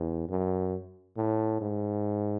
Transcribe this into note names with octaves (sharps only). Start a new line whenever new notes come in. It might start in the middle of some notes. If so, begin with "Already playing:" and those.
Already playing: E2
F#2
A2
G#2